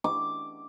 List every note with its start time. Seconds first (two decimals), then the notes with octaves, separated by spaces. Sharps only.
0.04 D6